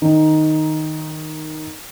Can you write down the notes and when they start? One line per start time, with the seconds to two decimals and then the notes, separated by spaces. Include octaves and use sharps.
0.02 D#3 D#4